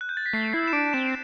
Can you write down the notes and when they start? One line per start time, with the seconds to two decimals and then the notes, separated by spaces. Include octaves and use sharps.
0.01 F#6
0.09 G6
0.17 A6
0.26 B6
0.33 A3 C7
0.53 E4 C7
0.67 E7
0.73 D4 D7
0.93 C4 E7